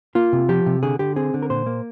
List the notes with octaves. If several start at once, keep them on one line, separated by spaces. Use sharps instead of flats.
A#3 F4
C3
F3 G4
C3
D3 G#4
D3 G4
C4 G#4
D3
A#4
A#2 C5
A#3